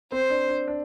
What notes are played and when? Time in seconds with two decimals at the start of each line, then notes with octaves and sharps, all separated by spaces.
0.12 C4 C5
0.30 D4
0.49 D4
0.68 D4